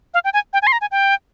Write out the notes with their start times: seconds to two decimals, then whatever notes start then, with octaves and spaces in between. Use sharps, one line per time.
0.14 F5
0.24 G5
0.33 G#5
0.53 G5
0.62 G#5
0.67 C6
0.72 A#5
0.81 G#5
0.91 G5